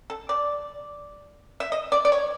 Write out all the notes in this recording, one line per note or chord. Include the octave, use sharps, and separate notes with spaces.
A4
D5
E5
D#5
D5
D5
C#5